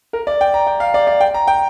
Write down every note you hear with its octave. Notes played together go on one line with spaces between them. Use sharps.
A#4
D5
G5
A#5
G5
F5
D5
D5
G5
A#5
G5